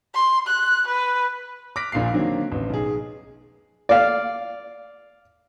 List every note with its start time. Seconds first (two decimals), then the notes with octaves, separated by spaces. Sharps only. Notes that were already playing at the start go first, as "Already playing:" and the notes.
0.15 C6
0.47 F#6
0.88 B4
1.76 D6 F6 F#6 A#6 B6 D7
1.92 A#1 A#2 F5 C7
2.13 D3 D#3 F#3 A#3 C4 D4
2.52 A1
2.70 B1 G#4
3.89 D5 F5